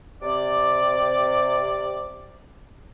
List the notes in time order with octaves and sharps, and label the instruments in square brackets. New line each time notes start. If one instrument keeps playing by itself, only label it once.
[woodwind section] C3 D5